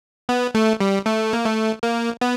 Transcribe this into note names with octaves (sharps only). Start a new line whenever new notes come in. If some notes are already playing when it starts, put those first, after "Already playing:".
B3
A3
G3
A3
A#3
A3
A#3
B3